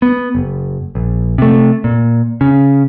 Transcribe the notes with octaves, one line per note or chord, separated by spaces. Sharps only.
B3
F#1
A#1
C3 A3
A#2
C#3